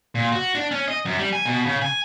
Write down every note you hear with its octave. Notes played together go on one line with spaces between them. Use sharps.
A#2
F#4
D4
C#4
D#5
F#2
G3
G#5
B2
C#3
G#5